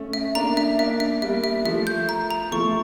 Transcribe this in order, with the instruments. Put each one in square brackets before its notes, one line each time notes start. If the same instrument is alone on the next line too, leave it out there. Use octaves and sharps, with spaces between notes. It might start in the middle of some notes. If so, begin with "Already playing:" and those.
Already playing: [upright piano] A3 C#4
[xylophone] E5
[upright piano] A#3 D4 [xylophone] A#5
[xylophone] E5
[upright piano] A#3 D4 [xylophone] E5
[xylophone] E5
[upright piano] G3 A#3 [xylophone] E5
[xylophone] E5
[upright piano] F3 A3 [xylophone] E5
[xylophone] G6
A#5
A#5
[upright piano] F3 A3 [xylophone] C#6